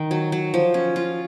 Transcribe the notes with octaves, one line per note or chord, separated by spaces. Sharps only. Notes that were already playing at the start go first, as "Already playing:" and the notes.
Already playing: D#3
F#3
F#3
F3
C#4
F4